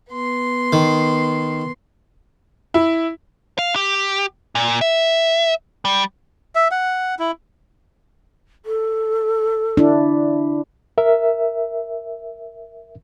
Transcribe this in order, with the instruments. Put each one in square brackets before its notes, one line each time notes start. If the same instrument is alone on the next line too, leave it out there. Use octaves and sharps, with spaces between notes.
[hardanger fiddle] B3 C6
[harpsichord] D#3
[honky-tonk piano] E4
[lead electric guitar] F5
G4
A#2
E5
G3
[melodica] E5
F#5
E4
[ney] A4
[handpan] D4 E4
[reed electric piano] A#4 E5